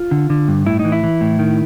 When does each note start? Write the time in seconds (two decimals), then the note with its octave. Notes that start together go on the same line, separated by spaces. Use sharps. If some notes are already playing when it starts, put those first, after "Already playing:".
Already playing: F4
0.11 D3
0.30 D3
0.48 G2
0.66 A2 E4
0.79 D#4
0.85 E3
0.92 E4
1.03 E3
1.21 A2
1.39 D#3